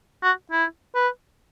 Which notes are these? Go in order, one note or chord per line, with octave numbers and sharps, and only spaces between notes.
F#4
E4
B4